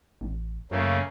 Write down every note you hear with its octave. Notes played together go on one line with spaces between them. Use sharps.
A1
F#2 C#3 A3 A#3